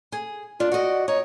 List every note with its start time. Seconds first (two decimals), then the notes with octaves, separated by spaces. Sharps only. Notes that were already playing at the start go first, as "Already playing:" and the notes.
0.12 G#4
0.60 D4 F4
0.72 F#4 D5 D#5
1.08 D#4 C#5